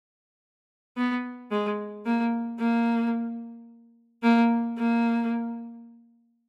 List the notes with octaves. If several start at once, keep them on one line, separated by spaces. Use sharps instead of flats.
B3
G#3
A#3
A#3
A#3
A#3